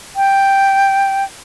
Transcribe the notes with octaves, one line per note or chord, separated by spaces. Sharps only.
G5